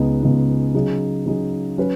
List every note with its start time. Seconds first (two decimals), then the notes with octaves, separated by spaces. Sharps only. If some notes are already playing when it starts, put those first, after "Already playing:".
Already playing: C#2 C#3 B3 D#4
0.23 C#2 C#3 B3 D#4
0.75 C#3 F#3 D#4 G#4
1.26 C#3 F#3 D#4 G#4
1.78 F#3 C#4 B4